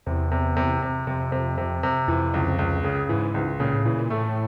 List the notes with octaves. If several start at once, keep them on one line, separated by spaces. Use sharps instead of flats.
E2 C3
C3
C3
C3
F2 C3
C3
C3
C3
F2 E3
C#2
C#2
C#3
G#2 E3
C#2
A#2 C#3
A2
A#2 E3
A#2
A2 A3